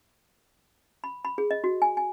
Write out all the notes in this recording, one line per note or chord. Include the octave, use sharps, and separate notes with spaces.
B5
B5
G#4
D#5
F#4
G#5
G#5